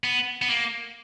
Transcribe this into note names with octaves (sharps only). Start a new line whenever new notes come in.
B3
B3
A#3